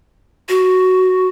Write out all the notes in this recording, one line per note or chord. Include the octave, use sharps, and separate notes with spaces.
F#4